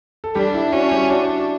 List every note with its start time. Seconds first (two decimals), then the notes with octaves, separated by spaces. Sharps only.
0.24 A4
0.35 G3 D4 G4
0.54 E4
0.72 C#4 F#4
0.91 G3 G4
1.10 D4 F#4